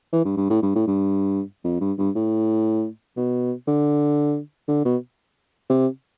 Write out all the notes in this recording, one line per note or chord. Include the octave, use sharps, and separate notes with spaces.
E3
G2
G2
A2
G2
A2
G2
F2
G2
G2
A2
B2
D3
D3
B2
C3